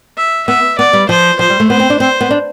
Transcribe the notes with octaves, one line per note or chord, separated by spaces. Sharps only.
E5
B3 E5
B3 D5
G3
F3 C5
F3 C5
G3
A3
B3 C5
C4
D4
C4 C5
B3
D4